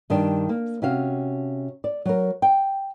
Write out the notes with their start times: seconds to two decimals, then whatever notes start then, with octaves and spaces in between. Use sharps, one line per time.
0.10 G2 D#3 G3 D4
0.49 A#3
0.82 C3 C#4 F#4 F5
1.84 D5
2.05 F#3 A#4
2.42 G5